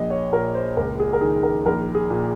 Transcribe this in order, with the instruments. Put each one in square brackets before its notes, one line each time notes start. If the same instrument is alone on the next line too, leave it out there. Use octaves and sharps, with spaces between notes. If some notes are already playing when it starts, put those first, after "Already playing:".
Already playing: [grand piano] A#1 D#5
C#5
A#2 A#4
C5
C#2 A#4
G#4
A#4
D#3 G#4
A#4
A#1 A#4
G#4
A#2